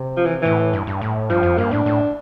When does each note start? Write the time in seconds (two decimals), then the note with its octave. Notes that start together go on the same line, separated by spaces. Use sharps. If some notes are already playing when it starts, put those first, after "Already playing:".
Already playing: C3
0.17 F3
0.25 E3
0.42 A2 E3
0.73 G2
0.87 G2
1.02 A2
1.30 G2 F3
1.43 F2
1.58 G2 A#3
1.71 A2 D4
1.86 A2